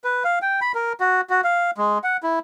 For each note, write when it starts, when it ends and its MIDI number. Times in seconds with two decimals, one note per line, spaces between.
0.04 0.23 71
0.24 0.39 77
0.42 0.60 79
0.61 0.72 83
0.75 0.93 70
1.00 1.21 66
1.30 1.41 66
1.44 1.71 77
1.78 1.98 56
2.04 2.17 78
2.23 2.39 64